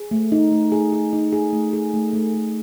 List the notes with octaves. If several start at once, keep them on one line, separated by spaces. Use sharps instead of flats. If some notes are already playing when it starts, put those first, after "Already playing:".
Already playing: G#4
A3
D#4
A3
G#4
G#4
D#4
G#4
A3
G#4
A3
A3
A3